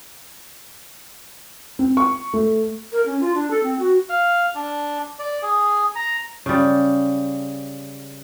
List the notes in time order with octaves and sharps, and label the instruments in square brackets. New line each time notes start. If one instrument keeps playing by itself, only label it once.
[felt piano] C4
C#6
A3
[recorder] A#4
C#4
F4
D4
A4
C4
F#4
[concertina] F5
D4
D5
G#4
A#5
[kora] C#3 G3